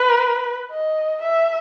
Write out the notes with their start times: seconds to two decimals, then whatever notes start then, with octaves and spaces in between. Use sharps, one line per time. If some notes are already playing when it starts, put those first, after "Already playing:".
Already playing: B4
0.71 D#5
1.22 E5